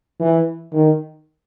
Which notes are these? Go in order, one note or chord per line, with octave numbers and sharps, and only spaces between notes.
E3
D#3